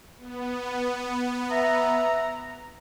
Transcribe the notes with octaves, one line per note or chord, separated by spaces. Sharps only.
B3
E5 A#5